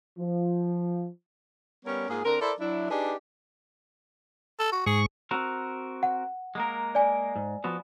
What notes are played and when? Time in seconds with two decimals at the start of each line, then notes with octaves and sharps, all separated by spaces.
0.18 F3
1.86 G3 B3 C#4 A#4 C#5
2.09 G#2 A#3 F4 G#4
2.25 D3 C4 D4 A#4
2.41 E4 A4 A#4 C5 D5
2.59 F#3 D4 E4
2.91 D4 D#4 G4 G#4 B4 D5
4.60 A4
4.72 F#4
4.86 G#2 G#4 C#6
5.31 C4 F#4 A#4
6.03 F#5
6.55 G#3 A#3 A#4
6.95 D5 G#5
7.36 G#2
7.64 F3 B3 F#4